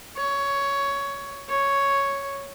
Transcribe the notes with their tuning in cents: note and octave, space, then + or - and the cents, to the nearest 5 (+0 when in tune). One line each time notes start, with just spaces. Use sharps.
C#5 +10
C#5 +0